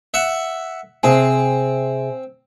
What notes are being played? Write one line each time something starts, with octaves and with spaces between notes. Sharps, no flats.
E5 F#5
C3 C4 G#4 G#5